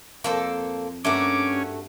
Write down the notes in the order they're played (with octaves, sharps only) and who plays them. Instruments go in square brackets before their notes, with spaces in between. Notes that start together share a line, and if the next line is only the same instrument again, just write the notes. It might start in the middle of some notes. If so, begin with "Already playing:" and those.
[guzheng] F2 A#5 [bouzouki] A#3 A4 C5
[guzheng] G2 A#3 [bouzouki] A3 F#4 [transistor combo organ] C#4 [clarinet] D6